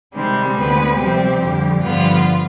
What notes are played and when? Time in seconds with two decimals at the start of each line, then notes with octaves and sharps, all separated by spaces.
0.15 C3 D#3 G3 G#3 C4 G4
0.57 D2 D3 G#3 B3 C4 B4
0.99 C3 F3 G3 C4 G4
1.41 F2 D3 G3
1.82 G2 D3 F3 G3 B3 F4